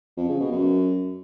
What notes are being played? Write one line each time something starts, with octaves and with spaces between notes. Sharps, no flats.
F2
C#3
B2
F#2